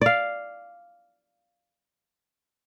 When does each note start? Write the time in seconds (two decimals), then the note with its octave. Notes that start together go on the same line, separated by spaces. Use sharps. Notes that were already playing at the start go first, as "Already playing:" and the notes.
0.02 D5 F5